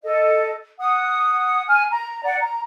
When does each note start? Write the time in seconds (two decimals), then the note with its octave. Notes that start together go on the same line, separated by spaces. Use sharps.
0.03 A4 D#5
0.78 F#5 D#6
1.68 G#5 F6
1.90 A#5
2.24 D5 F#5
2.41 A#5